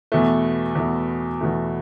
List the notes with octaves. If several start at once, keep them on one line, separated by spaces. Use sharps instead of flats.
E2 B2 A3
E2 B2 A3
E2 B2 A3